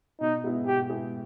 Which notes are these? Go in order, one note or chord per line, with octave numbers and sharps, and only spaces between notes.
B2 D#4
G#3 B3 E4 G#4
B2 G4
G#3 B3 E4 G#4